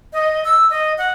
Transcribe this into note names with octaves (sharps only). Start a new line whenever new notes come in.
D#5
E6
D#5
F#5